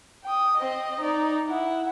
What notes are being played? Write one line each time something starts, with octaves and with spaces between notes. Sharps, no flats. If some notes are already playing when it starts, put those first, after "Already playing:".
G5 D#6
C4 D#5
D#4 D5
E4 F#5